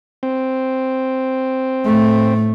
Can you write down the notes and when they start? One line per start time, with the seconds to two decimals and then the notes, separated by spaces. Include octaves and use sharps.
0.23 C4
1.85 A2 A3